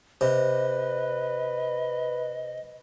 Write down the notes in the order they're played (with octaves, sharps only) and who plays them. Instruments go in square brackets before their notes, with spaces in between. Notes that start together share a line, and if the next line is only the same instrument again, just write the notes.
[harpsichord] C3 [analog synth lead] B4 [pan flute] D#5